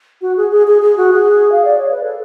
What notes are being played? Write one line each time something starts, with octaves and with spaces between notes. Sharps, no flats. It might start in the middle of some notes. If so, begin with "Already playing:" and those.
F#4
G#4
G#4
G#4
G#4
F#4
G#4
F5
D5
C#5
B4
A4